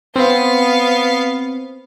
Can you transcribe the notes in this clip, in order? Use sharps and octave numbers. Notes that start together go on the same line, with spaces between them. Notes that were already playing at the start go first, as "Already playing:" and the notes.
B3 C4 F5